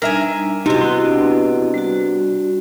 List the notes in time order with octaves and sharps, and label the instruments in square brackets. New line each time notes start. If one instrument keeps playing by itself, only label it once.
[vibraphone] G3 D4 D#4 [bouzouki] A#4 E5 G#5
[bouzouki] C3 B3 [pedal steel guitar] D#4 [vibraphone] E4 F#4 D#5
[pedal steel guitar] B4 C6
D4
[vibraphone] G3 F#4